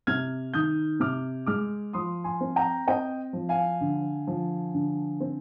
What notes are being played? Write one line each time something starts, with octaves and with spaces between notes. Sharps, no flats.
C3 F6 G#6
D#3 D#6 G6
C3 D6 F6
G#3 D6 F6
F3 C6 D#6
G#5 C6
C4
G5 A#5
C4 D#5 G5
F3
F5 G#5
D3
F3
D3
C4